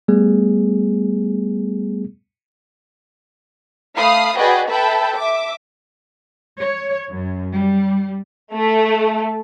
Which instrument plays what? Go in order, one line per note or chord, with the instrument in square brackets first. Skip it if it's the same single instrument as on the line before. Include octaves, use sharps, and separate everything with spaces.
[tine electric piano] G3 A3 B3 G#4
[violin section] A3 F5 B5 D#6 C7
F#4 G#4 B4 D5 D#5 G5
A4 B4 E5 G5 A5 B5
E5 D6
[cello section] C#5
F#2
G3
[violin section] A3